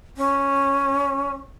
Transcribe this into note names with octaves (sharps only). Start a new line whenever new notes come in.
C#4